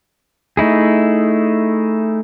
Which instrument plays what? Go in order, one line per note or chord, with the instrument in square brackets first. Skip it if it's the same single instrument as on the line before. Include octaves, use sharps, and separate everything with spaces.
[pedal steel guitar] A3 D#4 E4 G#4